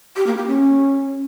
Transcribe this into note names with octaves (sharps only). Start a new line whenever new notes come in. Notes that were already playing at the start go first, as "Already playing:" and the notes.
G4
A#3
G4
C#4